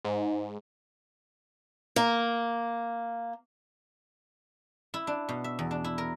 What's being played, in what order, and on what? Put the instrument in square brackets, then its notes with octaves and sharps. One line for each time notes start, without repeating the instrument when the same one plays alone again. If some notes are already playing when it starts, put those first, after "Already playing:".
[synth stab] G#2
[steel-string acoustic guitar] A#3
[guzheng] E4
D4
B2
E5
E2
D4
E4
A#4